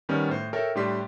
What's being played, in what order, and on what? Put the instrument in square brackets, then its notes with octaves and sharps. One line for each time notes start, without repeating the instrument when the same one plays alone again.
[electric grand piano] D#3 G3 B3 C#4
A2 C5
A4 A#4 C#5 E5 G5
A2 G3 D4 G4 C6 B6